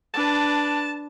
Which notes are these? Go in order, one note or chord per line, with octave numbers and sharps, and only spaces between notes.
D4 B4 A5